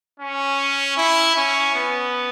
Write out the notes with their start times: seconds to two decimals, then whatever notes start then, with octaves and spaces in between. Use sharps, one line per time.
0.20 C#4
0.97 E4
1.36 C#4
1.75 B3